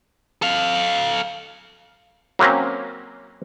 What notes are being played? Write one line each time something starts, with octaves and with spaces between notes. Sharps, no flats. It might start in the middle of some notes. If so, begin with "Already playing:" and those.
A4 F5
F#3 A#3 C4 C#4